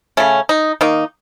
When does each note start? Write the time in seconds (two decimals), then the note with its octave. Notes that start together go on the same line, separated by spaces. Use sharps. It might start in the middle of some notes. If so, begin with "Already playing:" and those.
0.17 C#3 A3 C#4
0.49 D#4
0.81 D#3 A#3 D#4